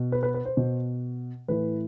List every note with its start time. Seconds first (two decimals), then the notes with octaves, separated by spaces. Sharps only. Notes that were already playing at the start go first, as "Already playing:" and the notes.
Already playing: B2
0.12 B4
0.23 B4
0.34 B4
0.45 C5
0.57 B2
1.48 A2 E3 B4